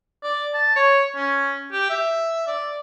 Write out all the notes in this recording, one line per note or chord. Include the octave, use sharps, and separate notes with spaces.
D5
A5
C#5
C#4
G4
E5
D5